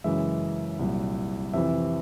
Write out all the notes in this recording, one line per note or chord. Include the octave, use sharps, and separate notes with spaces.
F#2 C#3 E3 G#3 E5
C2 A#2 F#3
F2 C3 E3 E5